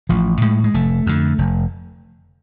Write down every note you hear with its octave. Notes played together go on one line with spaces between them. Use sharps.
A1 F3
A2 G#3
G#3
F1 A3
F2 D3
F1